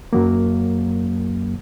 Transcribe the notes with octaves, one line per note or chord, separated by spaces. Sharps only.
F#2 F#3 A#3